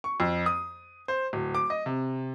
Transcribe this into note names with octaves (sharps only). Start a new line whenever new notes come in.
C#6
F2
D#6
C5
D1
D6
D#5
C3